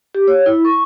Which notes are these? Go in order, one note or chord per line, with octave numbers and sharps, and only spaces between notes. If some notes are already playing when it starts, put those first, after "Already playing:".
G4
C#5
E4
C#6